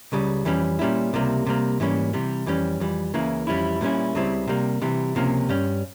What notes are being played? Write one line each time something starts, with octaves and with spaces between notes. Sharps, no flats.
C#2 C#3 G3
F2 E3 G3 C#4
A#2 G3 C#4 E4
C#2 C3 G3 A#3 E4
C3 G3 A#3
G#2 E3 G3 A#3 C#4
C3 E3 G3
F2 E3 G3 C#4
F2 E3 G3
C#2 C#3 E3 A#3 E4
F2 E3 G3 C#4 E4
A#2 G3 A#3 C#4 E4
C#2 C#3 G3 C4 E4
C3 G3 A#3
C3 E3 G3
C#2 C3 F3 A#3 C#4
G2 G3 C#4